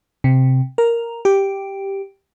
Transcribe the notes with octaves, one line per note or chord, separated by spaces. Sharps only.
C3
A#4
G4